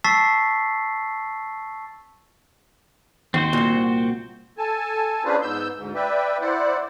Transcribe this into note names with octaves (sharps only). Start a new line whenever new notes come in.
A5 C#6 E6 A6 B6 C7
D#2 C4 F#4 C5
C2 A#2
A4 G#5 A5
C#4 D4 F4 G#4 B4 C5
G#2 B3 E6 G6
D2 G#2
B4 D5 E5 G5
E4 C5 D5 F#5